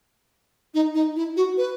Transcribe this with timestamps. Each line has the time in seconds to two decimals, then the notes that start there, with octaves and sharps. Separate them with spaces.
0.74 D#4
0.95 D#4
1.16 E4
1.37 F#4
1.57 B4